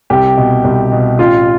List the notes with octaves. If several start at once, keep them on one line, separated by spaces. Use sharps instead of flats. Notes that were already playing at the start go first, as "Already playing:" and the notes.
C2 G4
B2
C2
B2
A1 F4